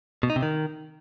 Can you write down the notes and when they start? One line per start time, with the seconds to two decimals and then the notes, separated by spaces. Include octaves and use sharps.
0.23 B2
0.30 D#4
0.36 C3
0.43 D#3